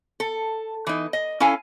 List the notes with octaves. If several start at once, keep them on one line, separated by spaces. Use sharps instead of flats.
A4
E3 D#4
D#5
C#4 E4 A4 F5 G#5